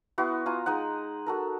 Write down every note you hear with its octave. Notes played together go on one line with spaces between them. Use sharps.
B3 E4 F#4 C6
F4 G#5 A#5
G#3 D#4 D#5 F#5
F#4 A4 A#4